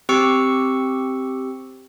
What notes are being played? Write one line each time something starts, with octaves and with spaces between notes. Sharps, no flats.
C4 G4 C#6 E6 C#7